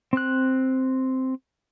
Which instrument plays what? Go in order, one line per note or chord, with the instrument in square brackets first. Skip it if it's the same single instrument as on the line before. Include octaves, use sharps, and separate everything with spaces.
[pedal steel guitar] C4 F#6